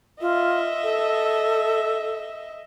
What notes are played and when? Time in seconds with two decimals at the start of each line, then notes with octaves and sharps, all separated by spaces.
0.21 F4 D#5 E5
0.83 A4